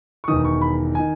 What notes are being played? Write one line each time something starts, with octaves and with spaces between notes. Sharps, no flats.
C#6
E1 E2 D#3 D#6
C#6
B5
D#3 G#5